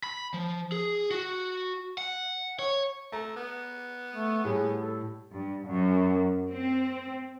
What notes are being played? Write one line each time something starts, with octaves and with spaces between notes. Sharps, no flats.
B5
F3
G#4
F#4
F#5
C#5
A3 A#5
B3
A3
A2 G3 G4 G#4
A4
G2
F#2
C4